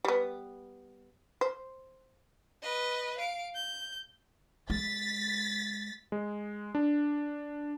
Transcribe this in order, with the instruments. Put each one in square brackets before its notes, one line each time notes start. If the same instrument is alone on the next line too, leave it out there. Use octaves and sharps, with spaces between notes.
[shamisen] G3 B3
C5
[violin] B4 D#5
F5 D7
G6
[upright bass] G#3 [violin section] A6 B6
[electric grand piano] G#3
D4